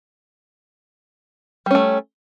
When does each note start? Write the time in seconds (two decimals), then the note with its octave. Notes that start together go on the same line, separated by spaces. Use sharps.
1.66 G3
1.71 C#4
1.75 A3